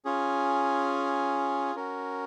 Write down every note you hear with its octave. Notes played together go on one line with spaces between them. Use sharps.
C#4 F4 G#4
C#4 F#4 A#4